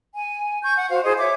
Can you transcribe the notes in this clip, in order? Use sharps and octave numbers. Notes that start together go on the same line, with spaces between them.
G#5
C#6 G6
F#5
F#4 C5 F5
E4 G#4 C5 D#5
C#5 E5 D6